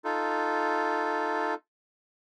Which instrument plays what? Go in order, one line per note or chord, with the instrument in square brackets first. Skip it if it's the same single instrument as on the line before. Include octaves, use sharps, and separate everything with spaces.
[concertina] D#4 F4 A4